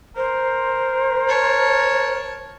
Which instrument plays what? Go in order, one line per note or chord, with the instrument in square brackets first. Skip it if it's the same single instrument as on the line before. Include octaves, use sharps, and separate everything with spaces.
[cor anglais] A#4 [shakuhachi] C5
[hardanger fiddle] C#5 A5